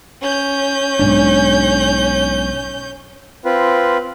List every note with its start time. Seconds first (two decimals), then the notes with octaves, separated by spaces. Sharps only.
0.22 C#4 G6
0.99 B1 G#2 D4
3.45 C4 F4 B4